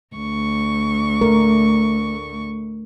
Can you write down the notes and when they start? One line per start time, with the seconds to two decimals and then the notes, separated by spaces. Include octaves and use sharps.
0.14 D2 C#6
1.21 A3 A#4